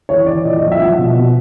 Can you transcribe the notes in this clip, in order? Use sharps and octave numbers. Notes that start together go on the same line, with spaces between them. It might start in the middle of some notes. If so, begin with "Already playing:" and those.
E3 C#5
E3 D5
A#2 D#5
F3 D#5
E5
F3 F#5
B2
B2